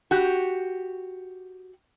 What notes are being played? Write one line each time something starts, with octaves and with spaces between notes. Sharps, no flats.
F#4 G4